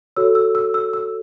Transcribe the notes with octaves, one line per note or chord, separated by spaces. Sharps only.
F#4 A4 C#5 E6
E6
E6
E6
E6